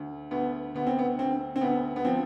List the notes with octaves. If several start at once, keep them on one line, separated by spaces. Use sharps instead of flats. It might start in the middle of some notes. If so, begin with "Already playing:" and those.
Already playing: D2
D2 B3
D2 B3
C4
B3
D2 C4
C4
D2 B3
B3
F3 C4